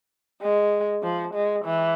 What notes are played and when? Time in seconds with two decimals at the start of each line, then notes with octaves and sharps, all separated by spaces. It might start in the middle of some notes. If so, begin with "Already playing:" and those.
0.42 G#3
1.03 F3
1.34 G#3
1.65 E3